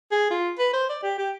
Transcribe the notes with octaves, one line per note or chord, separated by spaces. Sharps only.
G#4
F4
B4
C5
D5
G4
G4